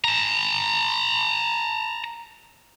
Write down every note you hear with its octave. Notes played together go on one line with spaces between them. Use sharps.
A5 A#5